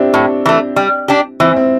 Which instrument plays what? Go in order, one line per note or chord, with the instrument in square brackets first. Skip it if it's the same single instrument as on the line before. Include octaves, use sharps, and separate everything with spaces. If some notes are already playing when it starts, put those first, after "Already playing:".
Already playing: [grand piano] C4 D4 E4 G4
[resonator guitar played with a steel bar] A2
E3 A3
G3
D4 G4
[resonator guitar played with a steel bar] E3 [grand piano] C4 E4
[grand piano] C4